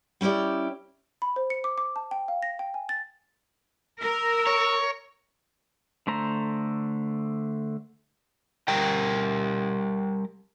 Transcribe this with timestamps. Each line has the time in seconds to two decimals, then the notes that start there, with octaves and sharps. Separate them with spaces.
0.21 G3 C#4 E4 G4 D5
1.22 B5
1.36 C5
1.50 C#7
1.64 D6
1.78 D6
1.96 A5
2.11 G5
2.28 F5
2.43 A#6
2.59 G5
2.74 G#5
2.89 A6
4.01 A#4 E6
4.47 C#5
6.07 D3 A3 C5 A#5
8.68 G3 G4 A#4 G5